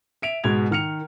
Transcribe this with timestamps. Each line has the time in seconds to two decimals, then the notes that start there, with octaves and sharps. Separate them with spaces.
0.22 E5 D7 F7
0.44 G#2 B2 G#3 G#6 F7
0.71 D#3 F6 C#7 F7